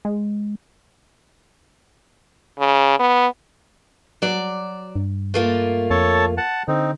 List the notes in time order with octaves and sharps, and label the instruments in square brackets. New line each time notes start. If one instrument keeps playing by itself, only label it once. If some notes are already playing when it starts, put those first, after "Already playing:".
[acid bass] G#3
[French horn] C#3
B3
[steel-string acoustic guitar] F#3 D5
[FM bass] G2
[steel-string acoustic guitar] A3 A#3 F4
[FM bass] F2 [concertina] A4 C#5 A5
[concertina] F#5 A5
[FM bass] D3 [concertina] C4 D#4